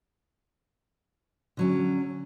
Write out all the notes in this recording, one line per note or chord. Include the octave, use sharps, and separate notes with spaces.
D3 F#3 C#4